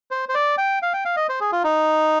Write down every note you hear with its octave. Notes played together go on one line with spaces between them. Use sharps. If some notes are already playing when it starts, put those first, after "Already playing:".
C5
C5
D5
G5
F5
G5
F5
D#5
C5
G#4
F4
D#4